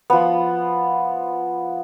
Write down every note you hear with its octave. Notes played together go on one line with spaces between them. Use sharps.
F3 B3